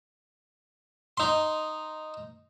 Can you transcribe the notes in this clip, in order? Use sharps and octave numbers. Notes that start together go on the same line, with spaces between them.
D#4 C6